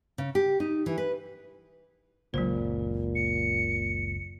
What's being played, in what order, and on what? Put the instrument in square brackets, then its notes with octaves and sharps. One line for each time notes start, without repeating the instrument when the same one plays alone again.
[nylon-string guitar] C#3
G4
D#4
E3
B4
[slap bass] F#1 C#2 F#2 [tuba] A#2 [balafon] F#3 C5
[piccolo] C#7